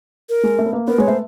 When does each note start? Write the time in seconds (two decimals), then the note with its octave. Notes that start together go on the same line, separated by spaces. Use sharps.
0.29 A#4
0.43 G#3
0.59 A3
0.66 B3
0.73 A#3
0.88 B3 A#4
0.98 G#3 C#5
1.08 A3 C5